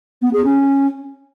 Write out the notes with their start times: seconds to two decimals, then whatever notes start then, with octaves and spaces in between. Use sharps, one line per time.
0.22 B3
0.33 G#4
0.45 C#4